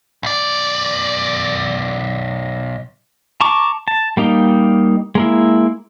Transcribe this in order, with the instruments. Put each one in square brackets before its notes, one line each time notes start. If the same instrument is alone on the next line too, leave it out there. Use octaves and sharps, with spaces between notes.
[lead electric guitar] B1 D5
[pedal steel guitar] A5 A#5 C#6 D6
A5
G3 A#3 D#4 G4
G#3 A#3 E4